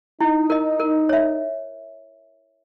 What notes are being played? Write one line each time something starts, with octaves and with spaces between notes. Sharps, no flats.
D#4 E4
A#4 D#5
A#4
C#5 E5